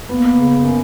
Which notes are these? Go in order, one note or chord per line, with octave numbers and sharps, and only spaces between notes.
A#3 B3
C#3
F#2